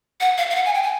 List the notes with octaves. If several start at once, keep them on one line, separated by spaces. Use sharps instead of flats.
F#5
F5
F5
F#5
G#5
G5
G#5